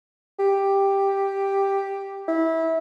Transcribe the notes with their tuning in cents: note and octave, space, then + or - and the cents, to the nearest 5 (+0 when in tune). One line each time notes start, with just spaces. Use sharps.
G4 +5
E4 -20